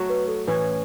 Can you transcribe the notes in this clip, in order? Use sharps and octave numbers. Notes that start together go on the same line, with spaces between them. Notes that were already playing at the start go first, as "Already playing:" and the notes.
Already playing: F#3 A3 F#4
B4
A4
A2 E3 C#4 B4